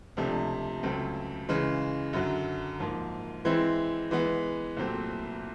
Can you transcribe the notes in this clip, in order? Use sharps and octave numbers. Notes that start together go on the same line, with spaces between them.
C#2 C3 F3 A3 D4
C#2 C#3 F#3 A3 C4
C#3 E3 G#3
F#2 D3 F#3
G#2 F3 A#3
E3 G#3 C4 E4
E3 G#3 B3
C2 A#2 F#3 A3 C4